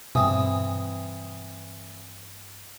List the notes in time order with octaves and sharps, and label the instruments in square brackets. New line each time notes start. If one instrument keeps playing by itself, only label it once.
[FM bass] G2 [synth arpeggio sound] B2 [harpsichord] E3 C4 [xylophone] G#5 D#6